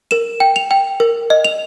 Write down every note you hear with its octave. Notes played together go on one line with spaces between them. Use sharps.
A#4 E7
G5
F7
G5
A#4
D#5
F7